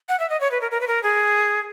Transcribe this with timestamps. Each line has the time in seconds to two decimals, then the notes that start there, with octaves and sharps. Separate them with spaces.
0.09 F#5
0.20 E5
0.30 D#5
0.41 C#5
0.51 B4
0.61 A#4
0.71 A#4
0.81 B4
0.88 A#4
1.03 G#4